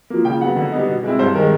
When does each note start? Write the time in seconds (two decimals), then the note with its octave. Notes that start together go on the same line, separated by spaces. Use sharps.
0.10 F3 A#3
0.25 C#3 G5
0.41 F#3 B3 F#5
0.56 D3
0.72 G3 B3 D#4
0.88 B2
1.03 G#3 C4 E4
1.19 G2 C5
1.35 D#3 A#4
1.38 G#3